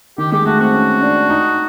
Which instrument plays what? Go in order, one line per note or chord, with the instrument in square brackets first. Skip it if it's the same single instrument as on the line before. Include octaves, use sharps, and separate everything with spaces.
[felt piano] D#3 [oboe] G4
[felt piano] G#3 [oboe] G4
[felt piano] A3 [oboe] F#4
[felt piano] C4 [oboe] F#4
[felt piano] C#4
D4
D#4